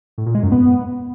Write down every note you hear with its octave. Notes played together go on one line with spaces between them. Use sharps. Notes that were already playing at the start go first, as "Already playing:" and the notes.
A2
A#2
G#3
F#2
B3